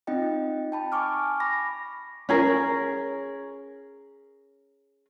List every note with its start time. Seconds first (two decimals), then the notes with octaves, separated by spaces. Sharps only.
0.07 C4 D#4 F4 D#5 G5
0.72 G5 A5 B5
0.92 G#5 A5 C#6 D6 F6
1.40 B5 D6 A#6
2.29 C#4 G#4 A#4